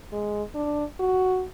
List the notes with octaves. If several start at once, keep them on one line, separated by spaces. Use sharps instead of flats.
G#3
D4
F#4